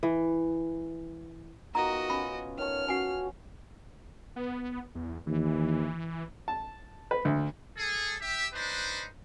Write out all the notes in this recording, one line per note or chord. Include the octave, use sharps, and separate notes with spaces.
E3
D#3 B3 F4 F#4 D#5 A#5
C#4 B5
D#3 C#5 A5 C#6 F6
C#4 F#4 C#5 F#5 G#5
B3
E2
D#2 E3
A5
B4
D2
G#4 A4
G4 E5
D4 D#4 B4 C5